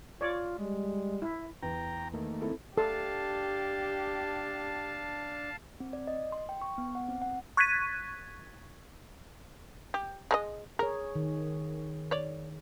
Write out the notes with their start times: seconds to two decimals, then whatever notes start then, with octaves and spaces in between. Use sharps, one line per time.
0.21 F4 C#5 D5
0.58 G3 G#3
1.22 E4
1.62 E2 G5 A#5
2.14 D#3 A3 A#3
2.42 C4 E4 A4
2.78 D4 G4 A4 F5 A5
5.80 C4
5.93 D5
6.07 D#5
6.32 C6
6.49 G5
6.62 C#6
6.78 B3
6.95 F#5
7.09 C4
7.22 F#5
7.57 C#6 F#6 G#6 A6 B6 D#7
9.94 G4
10.31 G#3 A#4 D#5
10.79 G#4 A#4 C#5
11.16 D#3
12.11 C#5 D5